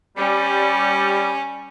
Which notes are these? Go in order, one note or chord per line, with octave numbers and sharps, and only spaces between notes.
G3 C#4